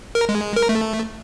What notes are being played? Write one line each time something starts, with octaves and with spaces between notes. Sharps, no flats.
A#4
G#3
A#4
A3